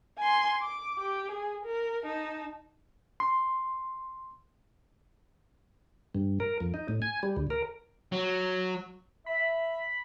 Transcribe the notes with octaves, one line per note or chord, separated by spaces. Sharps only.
G#5 C6
D6
G4
G#4
A#4
D#4 A5
C6
G2
A#4
F2
D#4
A2
G#5
G3
D2
A#4
F#3
E5 B5